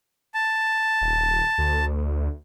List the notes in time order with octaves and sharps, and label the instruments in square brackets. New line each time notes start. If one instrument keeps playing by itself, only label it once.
[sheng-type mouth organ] A5
[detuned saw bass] D#1
D2